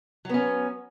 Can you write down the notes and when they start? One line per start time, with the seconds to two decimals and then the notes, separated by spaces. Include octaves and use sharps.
0.25 F#3
0.29 B3
0.34 C#4